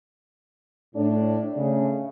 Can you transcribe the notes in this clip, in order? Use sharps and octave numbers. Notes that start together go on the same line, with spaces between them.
A2 D4
C#3 A3